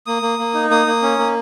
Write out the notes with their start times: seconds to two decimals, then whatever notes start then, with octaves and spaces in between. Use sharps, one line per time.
0.06 A#3 D#6
0.22 A#3
0.39 A#3
0.54 D#4
0.70 A#3 D#6
0.87 A#3
1.02 C#4
1.19 A#3